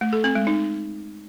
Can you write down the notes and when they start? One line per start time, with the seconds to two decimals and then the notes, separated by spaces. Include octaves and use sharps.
0.01 A3
0.13 A4
0.24 C4
0.35 G#3
0.47 D#4